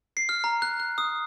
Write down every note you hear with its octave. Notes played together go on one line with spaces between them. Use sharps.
C7
F6
A#5
F#6
F#6
D#6